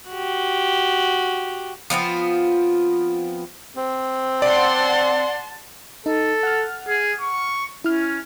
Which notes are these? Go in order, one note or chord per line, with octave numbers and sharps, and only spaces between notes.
F#4 G4
F3 B3 C4 F4
C4
D5 F#5 A5 C6
D#4 A4
F#5 F6
G#4
C#6
C#4 E4 F6